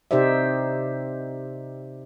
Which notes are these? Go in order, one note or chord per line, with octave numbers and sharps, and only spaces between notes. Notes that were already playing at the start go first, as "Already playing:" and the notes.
C3 D#4 G4 C5 D5 E5